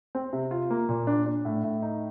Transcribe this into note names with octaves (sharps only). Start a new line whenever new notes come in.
C4
C3
F4
A#3
A#2
D4
D4
A2
A2
D#4